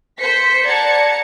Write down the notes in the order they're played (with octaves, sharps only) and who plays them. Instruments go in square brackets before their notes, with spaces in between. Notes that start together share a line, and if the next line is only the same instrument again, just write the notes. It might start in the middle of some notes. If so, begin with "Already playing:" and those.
[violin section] C5 B6 C#7
D5 F#5 A5 A#5 G#6 C#7